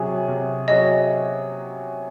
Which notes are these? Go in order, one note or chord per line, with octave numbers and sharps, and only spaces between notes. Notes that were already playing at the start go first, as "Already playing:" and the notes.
Already playing: C3 F#3 C#4 G#4
C3
F#3 C#4 G#4 D#5